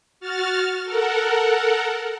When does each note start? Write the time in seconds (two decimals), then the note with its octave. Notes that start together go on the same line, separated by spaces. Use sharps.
0.20 F#4 F6 A6
0.84 A4 A#4 F#5